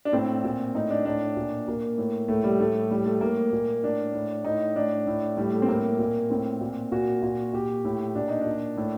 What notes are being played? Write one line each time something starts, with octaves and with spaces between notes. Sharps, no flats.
D4
A2 C4
A#2
A2 D#4
D4
A2 D4
A#2
A#2 A#3
A2
A2 A3
G3
A2 A3
A2 G3
A3
A2 A#3
A#2
A2 D4
A2
A2 D#4
A2 D4
A2
A2 G3
A3
C4
A2 A#3
A#2
A2 C4
A#2
A#2 F#4
A#2
A#2 G4
A2
A#2 D4
D#4
A#2 D4
A2